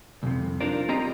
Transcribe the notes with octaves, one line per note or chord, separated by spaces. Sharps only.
C2 F2 C3
D4 D#4 F4 A#4 C5 D5
C4 F4 G4 D#5 A#5